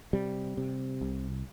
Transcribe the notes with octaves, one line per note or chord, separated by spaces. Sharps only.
C3 G3
C3
C2